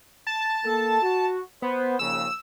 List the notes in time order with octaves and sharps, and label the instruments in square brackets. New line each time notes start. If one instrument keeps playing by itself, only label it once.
[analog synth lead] A5
[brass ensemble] A#3 A4
F#4
[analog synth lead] B3 [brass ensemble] C5
[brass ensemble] A#1 D#2 C#3 [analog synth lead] E6